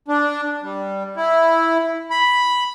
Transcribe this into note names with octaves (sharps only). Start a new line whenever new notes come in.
D4
G3
E4
B5